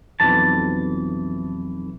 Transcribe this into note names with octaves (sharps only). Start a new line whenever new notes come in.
B1 F2 E3 A5